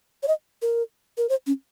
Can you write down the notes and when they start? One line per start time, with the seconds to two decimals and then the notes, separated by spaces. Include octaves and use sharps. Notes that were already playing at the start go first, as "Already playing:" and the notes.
0.23 C#5
0.28 D#5
0.62 A#4
1.18 A#4
1.29 C5
1.47 C#4